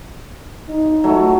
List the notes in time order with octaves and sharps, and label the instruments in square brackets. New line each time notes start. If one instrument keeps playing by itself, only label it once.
[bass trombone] D#4
[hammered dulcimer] F#3 A3